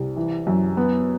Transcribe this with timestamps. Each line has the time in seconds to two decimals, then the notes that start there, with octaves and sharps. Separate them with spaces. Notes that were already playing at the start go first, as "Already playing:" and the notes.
Already playing: C2
0.17 E3
0.47 F#2
0.77 B3